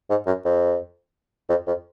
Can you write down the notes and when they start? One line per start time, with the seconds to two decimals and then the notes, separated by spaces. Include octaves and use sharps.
0.10 G#2
0.26 F#2
0.45 F2
1.49 F2
1.67 F2